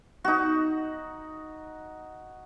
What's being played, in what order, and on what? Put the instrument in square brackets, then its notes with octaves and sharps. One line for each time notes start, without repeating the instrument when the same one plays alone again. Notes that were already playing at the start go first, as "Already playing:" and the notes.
[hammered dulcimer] D#4 F#4